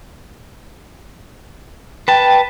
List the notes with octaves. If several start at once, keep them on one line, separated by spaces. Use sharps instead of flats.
B4 G5 A5